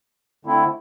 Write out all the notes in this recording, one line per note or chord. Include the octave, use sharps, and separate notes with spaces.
D3 A3 C4 E4